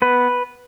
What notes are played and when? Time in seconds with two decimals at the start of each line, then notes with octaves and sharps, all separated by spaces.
0.02 B3 B4